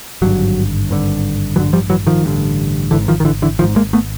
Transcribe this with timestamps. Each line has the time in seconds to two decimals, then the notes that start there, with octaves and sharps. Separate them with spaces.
0.22 G#1 G2 D3 F#3
0.89 G#1 G2 D3
1.56 A1 G2 D3 E3 F#3
1.73 F3 G3
1.90 E3 F#3
2.07 D#3 F3
2.24 A1 G2 D3
2.91 G#1 G#2 D3 E3
3.08 D#3 F3
3.20 D#3
3.25 D3 E3
3.42 D3 E3
3.59 G#1 D#3 F3
3.63 G#2
3.76 G#3 A#3
3.93 A3 B3